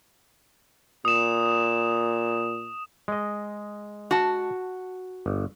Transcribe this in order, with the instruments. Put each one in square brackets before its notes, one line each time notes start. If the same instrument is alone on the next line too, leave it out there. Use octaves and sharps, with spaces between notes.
[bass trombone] A#2 [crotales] D#6 E7
[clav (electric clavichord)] G#3 D#5
[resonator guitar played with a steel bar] F#4 A5
[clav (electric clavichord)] G1